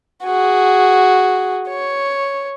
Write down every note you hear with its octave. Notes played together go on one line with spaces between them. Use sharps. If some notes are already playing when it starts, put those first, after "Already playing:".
F#4 G#4
C#5